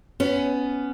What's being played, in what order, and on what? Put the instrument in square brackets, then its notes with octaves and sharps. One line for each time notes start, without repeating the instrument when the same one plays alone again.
[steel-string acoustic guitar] B3 C#4